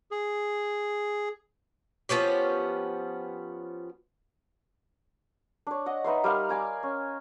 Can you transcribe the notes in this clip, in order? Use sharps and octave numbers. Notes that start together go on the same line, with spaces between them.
G#4
F3 B3 C#4 G4
D4 C#5
D#5 F#5
D#4 B4 E5 C6
G3 A#4 F5 C6
D5 G#5 D6
C#4